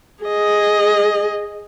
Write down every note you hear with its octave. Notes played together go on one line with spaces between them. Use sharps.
G#4 D#5